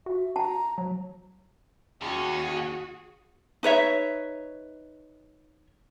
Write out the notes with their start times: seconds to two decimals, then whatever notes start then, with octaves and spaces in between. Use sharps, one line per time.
0.06 F#4 E5
0.36 A5 A#5
0.78 F#3
2.02 D#2 C#4 F#4 G#4
3.63 D#4 B4 C#5 E5